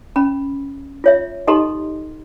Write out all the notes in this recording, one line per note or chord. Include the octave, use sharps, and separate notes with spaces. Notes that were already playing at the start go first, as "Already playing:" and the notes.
C#4 B5
F4 C#5 E5
D#4 G4 A4 D#5 A#5 C6